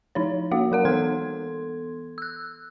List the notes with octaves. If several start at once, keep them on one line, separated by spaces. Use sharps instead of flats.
F3 D#4 E4 C#5
A#3 F#4 F5
F#3 A#4 F#5
E3 B3 A4 C6 G#6
E6 F#6